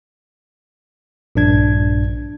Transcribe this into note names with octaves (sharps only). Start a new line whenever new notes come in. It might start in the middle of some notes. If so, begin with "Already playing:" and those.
A#1 G2 D4 G#6